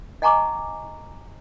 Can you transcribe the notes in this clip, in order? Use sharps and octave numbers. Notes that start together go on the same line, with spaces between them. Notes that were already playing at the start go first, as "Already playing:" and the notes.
D#5 F#5 G#5 A#5 C#6 D6